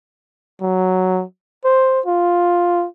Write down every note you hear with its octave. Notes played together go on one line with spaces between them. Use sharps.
F#3
C5
F4